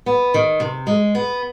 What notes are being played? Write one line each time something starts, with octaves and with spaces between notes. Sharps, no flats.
B3
D#3
C3
G#3
B3